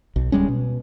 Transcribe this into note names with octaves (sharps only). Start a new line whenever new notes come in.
B1
D1 G3 G#3 C#4
B2